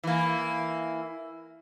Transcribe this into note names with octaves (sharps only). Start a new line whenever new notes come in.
E3 A#3